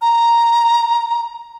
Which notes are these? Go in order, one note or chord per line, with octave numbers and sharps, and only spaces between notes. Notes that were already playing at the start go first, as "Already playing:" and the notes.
A#5